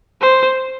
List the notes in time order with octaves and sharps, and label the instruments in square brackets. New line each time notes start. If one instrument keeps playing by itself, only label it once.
[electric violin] C5